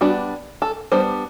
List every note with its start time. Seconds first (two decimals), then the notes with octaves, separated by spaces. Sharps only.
0.01 G3 B3 D4 F#4
0.62 A4
0.92 G3 B3 D4 C5